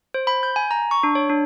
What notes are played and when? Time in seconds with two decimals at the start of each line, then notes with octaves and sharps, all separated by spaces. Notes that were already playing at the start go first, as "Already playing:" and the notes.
0.14 C5
0.27 B5
0.43 G6
0.56 G#5
0.71 A#5
0.91 C#6
1.03 D4
1.15 C#5
1.30 D4